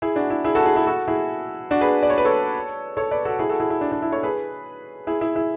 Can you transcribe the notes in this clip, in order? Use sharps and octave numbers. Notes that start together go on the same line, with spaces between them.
E4 G#4
D4 F#4
E4
E4 G#4
F#4 A4
E4 G#4
E4 G#4
F#4 A4
E4 G#4
D4 F#4
G#4 B4
D5
C#5
B4
A4 C#5
A4 C#5
B4 D5
F#4 A4
E4 G#4
F#4 A4
E4 G#4
E4
D4
D4
E4
A4 C#5
G#4 B4
E4 G#4
E4 G#4
E4 G#4